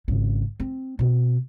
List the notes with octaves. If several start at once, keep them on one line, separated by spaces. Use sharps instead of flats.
G#1 C#3
C4
B2 C4